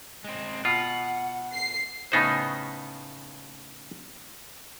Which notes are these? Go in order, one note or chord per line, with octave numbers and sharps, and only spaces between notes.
G#3 C4
B2 F4 F#5
C7
A2 C#3 B3 D#4 G#4 C5